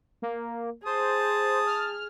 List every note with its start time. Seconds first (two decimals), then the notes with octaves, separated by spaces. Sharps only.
0.22 A#3
0.86 G#4 C5 A5 D#6
1.67 F6